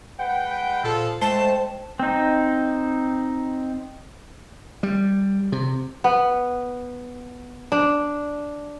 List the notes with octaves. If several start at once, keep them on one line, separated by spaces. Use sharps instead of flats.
G#3 B4 F#5 G5
A#2 F3 A4
G#3 A3 C5 G5 A5
C4 D#4
G3
C3
B3
D4